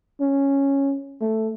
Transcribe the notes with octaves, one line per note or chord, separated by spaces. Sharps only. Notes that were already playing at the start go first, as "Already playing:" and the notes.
C#4
A3